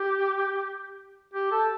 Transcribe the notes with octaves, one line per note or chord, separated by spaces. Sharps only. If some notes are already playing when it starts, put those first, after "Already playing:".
Already playing: G4
G4
A4